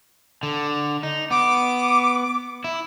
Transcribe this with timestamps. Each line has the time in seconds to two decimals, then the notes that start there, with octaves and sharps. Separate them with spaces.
0.43 D3
1.03 D#4
1.30 B3 D6
2.64 E4